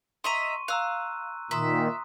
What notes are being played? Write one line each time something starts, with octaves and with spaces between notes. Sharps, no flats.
D#5 E5 A#5 C6 C#6 D#7
F5 A#5 E6 F#6
A#2 D#3 E5 A#5 C6 D#6